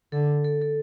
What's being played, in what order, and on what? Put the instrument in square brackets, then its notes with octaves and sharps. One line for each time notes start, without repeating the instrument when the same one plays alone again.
[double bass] D3 [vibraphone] A4
[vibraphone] A4
A4